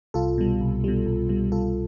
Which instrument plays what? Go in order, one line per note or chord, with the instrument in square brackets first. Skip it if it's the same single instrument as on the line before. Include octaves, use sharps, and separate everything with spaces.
[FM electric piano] C2 F4 A4
B2 G3
C2
B2 G3
C2
B2 G3
C2 F4 A4